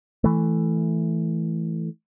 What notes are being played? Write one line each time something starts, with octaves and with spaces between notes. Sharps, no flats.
E3 A3